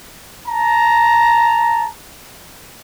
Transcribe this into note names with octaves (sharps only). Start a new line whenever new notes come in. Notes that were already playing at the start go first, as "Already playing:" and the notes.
A5 A#5